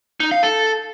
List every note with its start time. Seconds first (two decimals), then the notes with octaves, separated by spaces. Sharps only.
0.20 D#4
0.32 F5
0.43 A4